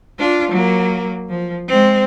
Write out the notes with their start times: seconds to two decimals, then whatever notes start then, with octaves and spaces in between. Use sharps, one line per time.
0.18 D4 F4
0.51 F#3 A#3
1.29 F3
1.68 G#3 C4